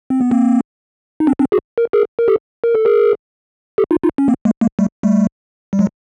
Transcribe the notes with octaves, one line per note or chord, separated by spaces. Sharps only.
C4
B3
A#3 C4
D#4
C4 D4
C4 D4
F#4 G#4
A#4
G#4 A#4
A#4
G4 A4
A#4
A4
G#4 A#4
G4 A4
D#4 F4
D#4 F4
C#4
A#3 C4
G#3 A#3
G#3 A#3
G3 A3
G3 A3
G3
F#3 G#3